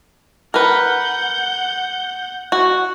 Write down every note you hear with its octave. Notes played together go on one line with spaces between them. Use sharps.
A#4 B4 F#5 G6
F#4